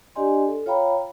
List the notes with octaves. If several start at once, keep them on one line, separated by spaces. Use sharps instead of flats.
D4 G4 D5 D#5 G#5 C6
A4
F4 C#5 F5 G5 A#5 B5